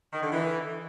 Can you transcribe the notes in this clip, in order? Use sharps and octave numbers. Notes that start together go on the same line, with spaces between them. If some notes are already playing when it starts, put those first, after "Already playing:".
D#3
D3
E3